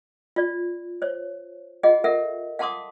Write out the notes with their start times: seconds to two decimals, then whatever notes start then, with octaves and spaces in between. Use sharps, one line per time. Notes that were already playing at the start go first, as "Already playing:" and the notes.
0.36 F4 D5
1.02 C5 C#5
1.83 F4 G#4 D#5 F#5
2.04 A4 A#4 E5 F#5
2.59 F5 F#5 A5 C6 D6 D#6